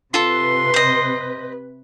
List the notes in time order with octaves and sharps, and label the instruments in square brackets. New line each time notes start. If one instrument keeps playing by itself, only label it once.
[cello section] C3 B4 [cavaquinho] F4 A4 [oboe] C6
[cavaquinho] C5 D#5